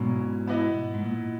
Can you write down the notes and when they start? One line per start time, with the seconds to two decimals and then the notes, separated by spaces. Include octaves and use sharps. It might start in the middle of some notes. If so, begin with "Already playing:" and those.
Already playing: G#2 B2 F#3 C#4 E4
0.47 E3 B3 E4 B4 D#5
0.94 G#2
1.02 A#2